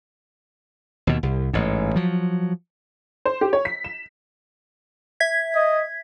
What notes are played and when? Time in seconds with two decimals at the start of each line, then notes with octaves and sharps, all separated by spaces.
1.07 D#2 B2
1.23 C2
1.53 A1 G#2
1.96 F3 F#3
3.25 C5
3.41 G4
3.53 C#5
3.65 B6
3.84 E7
5.20 E5 G#6 B6
5.55 D#5